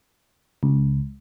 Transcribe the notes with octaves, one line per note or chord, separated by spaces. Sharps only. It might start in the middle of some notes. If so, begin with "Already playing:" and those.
C#2